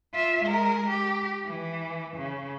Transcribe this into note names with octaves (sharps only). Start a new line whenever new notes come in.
F4 E5
G#3 A#4
G4
E3
C#3